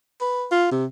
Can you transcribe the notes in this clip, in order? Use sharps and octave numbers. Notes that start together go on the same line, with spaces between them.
B4
F4
C3